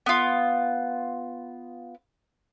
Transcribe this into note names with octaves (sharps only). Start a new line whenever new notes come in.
B3 F4